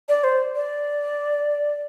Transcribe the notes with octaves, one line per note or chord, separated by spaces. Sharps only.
D5
C5
D5